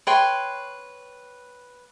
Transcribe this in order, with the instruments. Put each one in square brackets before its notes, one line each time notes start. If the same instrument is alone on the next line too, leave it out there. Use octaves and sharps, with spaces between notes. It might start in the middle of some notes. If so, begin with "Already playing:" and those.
[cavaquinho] B4 C#5 G5 C6